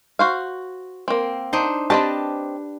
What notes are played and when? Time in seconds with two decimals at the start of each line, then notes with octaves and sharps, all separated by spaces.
0.19 F#4 C5 F5
1.08 A#3 C4
1.53 D4 D#4 C5
1.90 C4 D4 G4 B4 D#5 A5